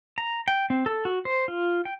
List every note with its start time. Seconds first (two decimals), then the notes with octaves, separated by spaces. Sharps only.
0.18 A#5
0.48 G5
0.70 C4
0.86 A4
1.05 F#4
1.25 C5
1.48 F4
1.85 G5